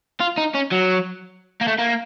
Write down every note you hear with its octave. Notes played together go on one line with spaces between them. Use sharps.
F4
D#4
C#4
F#3
A#3
A3
A#3